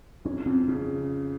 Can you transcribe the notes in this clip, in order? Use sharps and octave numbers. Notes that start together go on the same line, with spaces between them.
F2 C#4
F2 C4
C#3 C#4